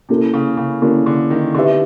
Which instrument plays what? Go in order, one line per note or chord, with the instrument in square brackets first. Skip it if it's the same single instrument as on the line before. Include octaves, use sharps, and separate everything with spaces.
[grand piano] C3 [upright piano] A#3 C#4 E4 A4
[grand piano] C#3
C#3
[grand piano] D3 [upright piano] A#3 C#4 E4 A4
[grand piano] D3
D#3
[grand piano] D3 [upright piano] C4 D#4 G4 B4 E5